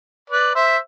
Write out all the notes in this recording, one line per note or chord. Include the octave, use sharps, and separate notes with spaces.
B4 D5
C5 E5